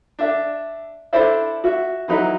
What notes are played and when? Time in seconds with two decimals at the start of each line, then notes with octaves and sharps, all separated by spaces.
0.19 D4 E5
1.13 D4 E4 A4 C5 D5 E5
1.64 F#4 E5
2.08 E3 F#3 D#4 B4